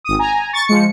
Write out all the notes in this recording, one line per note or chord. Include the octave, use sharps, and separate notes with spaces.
G#1 D#6
G#5 A#5
C#6 A6
F3 G#3 C#7